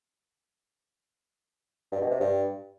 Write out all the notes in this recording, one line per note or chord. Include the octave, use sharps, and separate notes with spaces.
G2
B2
C3
G2